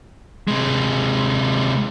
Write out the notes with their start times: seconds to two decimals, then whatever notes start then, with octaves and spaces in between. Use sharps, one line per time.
0.48 C3 G#3